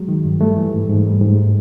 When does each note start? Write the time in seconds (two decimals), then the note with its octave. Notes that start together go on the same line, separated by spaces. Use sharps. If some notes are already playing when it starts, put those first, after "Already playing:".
Already playing: F#3 G#3
0.08 D#3
0.25 G2
0.41 G3 A3
0.57 E3
0.73 G#2
0.89 G#2
1.05 G3
1.21 G#2